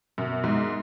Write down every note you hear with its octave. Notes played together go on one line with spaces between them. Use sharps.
F#2 B2
G#2 G#3